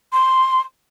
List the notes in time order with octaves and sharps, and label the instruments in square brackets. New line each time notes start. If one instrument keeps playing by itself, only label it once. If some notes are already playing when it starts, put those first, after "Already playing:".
[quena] C6